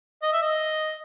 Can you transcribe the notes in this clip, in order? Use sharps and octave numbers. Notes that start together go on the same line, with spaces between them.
D#5
E5
D#5